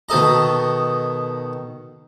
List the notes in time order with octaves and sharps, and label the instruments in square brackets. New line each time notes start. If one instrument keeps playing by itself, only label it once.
[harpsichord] B2 D#3 A4 D#5 A#5